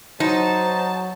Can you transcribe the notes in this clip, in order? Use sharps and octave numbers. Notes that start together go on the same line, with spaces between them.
F#3 D#4 C5 A5